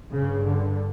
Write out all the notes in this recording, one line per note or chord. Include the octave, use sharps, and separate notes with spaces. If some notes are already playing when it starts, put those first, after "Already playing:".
G2 C#3
D3